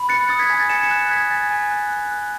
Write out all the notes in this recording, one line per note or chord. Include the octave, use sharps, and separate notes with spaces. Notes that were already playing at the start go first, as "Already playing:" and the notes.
Already playing: B5
F#6 A6 C#7
D#6 A6
G#6 B6
G#5 G#6 B6
A6
G#5 C#7 E7
C#7 E7
F#6
D#6 G#6 B6
G#5 A6
G#5
F#6
F#6
F#6